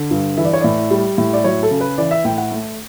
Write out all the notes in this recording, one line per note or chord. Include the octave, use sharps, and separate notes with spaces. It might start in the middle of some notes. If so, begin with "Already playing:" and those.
Already playing: D3
G2
E3 E5
D5
C#5
A2 D5
G3
A2
D5
F#3 C#5
A4
C#3
B4
E3 D5
E5
A2 G5
F#5
A3